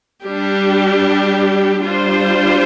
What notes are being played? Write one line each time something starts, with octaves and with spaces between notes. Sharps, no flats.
G3 D4 G4
G3 D4 F4 C5